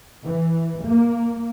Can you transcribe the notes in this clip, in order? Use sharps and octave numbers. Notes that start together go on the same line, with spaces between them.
E3
A#3